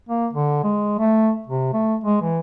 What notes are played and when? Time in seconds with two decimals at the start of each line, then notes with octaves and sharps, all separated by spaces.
0.09 A#3
0.33 D3
0.64 G#3
0.99 A3
1.47 C3
1.73 A3
2.04 G#3
2.22 E3